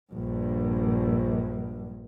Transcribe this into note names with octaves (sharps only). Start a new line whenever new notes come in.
A#1 G2